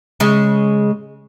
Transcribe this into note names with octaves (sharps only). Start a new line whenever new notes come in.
C#3 G#3